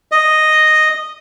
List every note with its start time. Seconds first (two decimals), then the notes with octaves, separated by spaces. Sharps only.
0.12 D#5